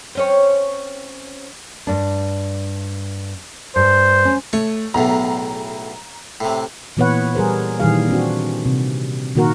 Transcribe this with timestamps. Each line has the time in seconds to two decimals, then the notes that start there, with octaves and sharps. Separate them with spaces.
0.15 C4 C#4 C#5
1.87 G2 D4
3.76 G2 C5
4.25 C#4
4.53 A3 C#5
4.94 B1 E2 A2 A#5
6.41 A2 C3
6.97 A#2 E3 B3 B4 C#5 F#5
7.35 G3 G#4 A#4 C5
7.80 A#2 D#3 E3 G3 G#4 F5
8.08 C4 D4 F#4
8.66 C3
9.35 A#2 D#3 A#3 F#4 A#4